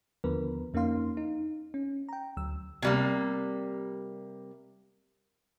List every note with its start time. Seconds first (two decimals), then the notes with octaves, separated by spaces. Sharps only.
0.24 D#2 D3 F3 B3 A#4 B4
0.74 F2 A#3 C#4 D#4 F5 C6
1.17 D#4
1.74 C#4
2.09 G5 A#5
2.37 D2 F#3 E6
2.82 C3 G3 A#3